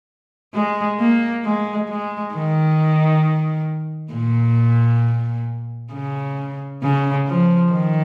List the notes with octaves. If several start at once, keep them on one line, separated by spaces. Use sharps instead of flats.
G#3
A#3
G#3
G#3
D#3
A#2
C#3
C#3
F3
D#3